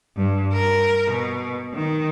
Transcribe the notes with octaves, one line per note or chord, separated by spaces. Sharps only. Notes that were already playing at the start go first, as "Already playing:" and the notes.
G2
A#4
B2
D#3